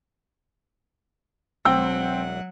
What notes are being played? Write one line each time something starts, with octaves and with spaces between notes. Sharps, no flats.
E1 F#3 C4 F#5 G5 E6